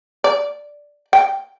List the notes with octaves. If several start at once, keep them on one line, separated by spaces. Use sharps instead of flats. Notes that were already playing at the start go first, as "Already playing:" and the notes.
D5
G5